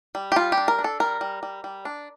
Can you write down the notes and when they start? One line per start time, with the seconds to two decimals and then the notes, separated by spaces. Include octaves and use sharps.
0.15 G3
0.32 G4
0.36 G3 F4
0.52 G4
0.57 D4
0.68 A#4
0.79 D4
0.84 A4
1.00 G3 A#4
1.21 G3
1.43 G3
1.64 G3
1.85 D4